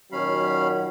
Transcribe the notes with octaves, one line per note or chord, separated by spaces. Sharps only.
A#2 D#3 F#3 C#4 F5 B5